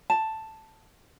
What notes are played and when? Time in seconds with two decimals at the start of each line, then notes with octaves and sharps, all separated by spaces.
0.10 A5